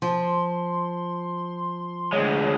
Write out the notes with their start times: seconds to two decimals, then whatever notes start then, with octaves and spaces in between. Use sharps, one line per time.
0.02 F3 C6
2.13 D2 G#3 C#5